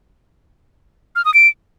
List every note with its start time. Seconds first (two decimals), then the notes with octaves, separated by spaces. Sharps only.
1.16 F6
1.25 D#6
1.34 D7